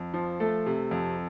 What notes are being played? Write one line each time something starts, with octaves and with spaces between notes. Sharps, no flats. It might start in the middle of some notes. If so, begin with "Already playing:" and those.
Already playing: F2
F3
A3 A4
C3
F2